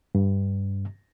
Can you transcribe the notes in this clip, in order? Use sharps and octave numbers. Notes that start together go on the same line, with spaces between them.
G2